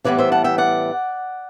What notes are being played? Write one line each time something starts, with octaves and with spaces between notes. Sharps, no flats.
A2 E3 G3 B3 B4 D5
C5 E5
F#5 A5
E5 G5
D5 F#5